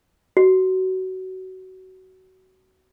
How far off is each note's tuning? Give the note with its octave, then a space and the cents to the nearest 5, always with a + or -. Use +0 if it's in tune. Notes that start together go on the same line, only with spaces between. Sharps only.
F#4 +20